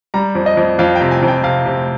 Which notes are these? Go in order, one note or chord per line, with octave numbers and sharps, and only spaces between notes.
G3 A#5
F2
D#5
F2
F2 F5
G5
C3
G#5
F2
G5
C3 F5
C3